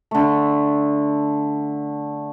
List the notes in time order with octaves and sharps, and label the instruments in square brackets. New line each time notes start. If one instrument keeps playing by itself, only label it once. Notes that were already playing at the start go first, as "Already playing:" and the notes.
[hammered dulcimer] D3 A3